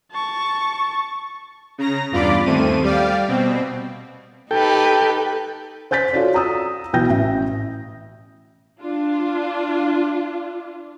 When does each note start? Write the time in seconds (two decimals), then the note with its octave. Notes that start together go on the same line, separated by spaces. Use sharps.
0.11 A5 C#6
1.78 C#3 A#5 A#6
2.12 E2 G2 F4 D5 B5 D6
2.46 D#2 A3 C4 D#7
2.83 G3 D5 F5 G5
3.28 B2 C4
4.51 D#4 G4 A4 B4 G5
5.91 C5 G#5 G6 A6 B6
6.13 F4 F#4 A4 C#5 D5
6.34 A#5 D#6 E6
6.93 B1 E3 F#4 G5 G6 A#6
7.09 A1 E5
8.80 D4 F4